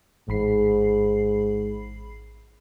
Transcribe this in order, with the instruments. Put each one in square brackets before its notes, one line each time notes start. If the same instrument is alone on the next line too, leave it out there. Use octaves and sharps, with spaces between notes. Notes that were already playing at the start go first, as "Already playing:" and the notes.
[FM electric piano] A1 B5 C7 [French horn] G#2